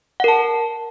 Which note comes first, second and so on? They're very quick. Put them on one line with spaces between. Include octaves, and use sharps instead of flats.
F#5 A#4 A5